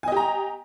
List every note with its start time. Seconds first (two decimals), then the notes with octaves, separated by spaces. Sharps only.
0.03 G#5
0.08 D#5
0.12 G4
0.17 A#5